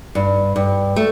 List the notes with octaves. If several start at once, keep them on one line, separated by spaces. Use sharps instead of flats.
G2
G2
A3